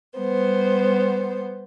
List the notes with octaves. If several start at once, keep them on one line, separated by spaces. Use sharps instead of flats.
G3 B3 C5